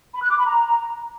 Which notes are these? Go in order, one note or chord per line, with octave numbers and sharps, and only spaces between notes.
B5
F#6
D6
B5
A#5